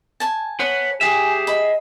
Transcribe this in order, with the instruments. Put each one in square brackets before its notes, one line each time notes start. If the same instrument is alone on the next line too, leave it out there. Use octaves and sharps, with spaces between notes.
[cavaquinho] G#5 A5
[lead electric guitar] B4 F#5 [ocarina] C#5
[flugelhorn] G4 [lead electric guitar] G#4 E5 [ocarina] G#5
[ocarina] D#5 [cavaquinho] B5